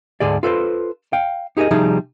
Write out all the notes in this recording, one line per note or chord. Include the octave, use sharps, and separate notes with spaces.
D2 G#2 D3 G#4 D5
F4 A4 B4 C5
F5 G5
D#4 G4 G#4 A#4 D#5
C3 F3 G3 D#4 G#4